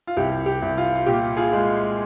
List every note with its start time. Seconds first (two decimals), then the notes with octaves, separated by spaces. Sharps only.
0.07 F4
0.17 C2 G4
0.46 G4
0.62 C2
0.78 F4
0.95 F4
1.06 A#2 G4
1.37 F4 G#4
1.53 G#3